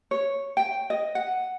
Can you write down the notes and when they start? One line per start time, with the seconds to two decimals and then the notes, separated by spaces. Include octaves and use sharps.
0.11 C#5
0.57 G5
0.90 D#5
1.15 F#5